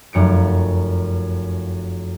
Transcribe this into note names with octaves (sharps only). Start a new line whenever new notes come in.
F1 F#2 C#7 D7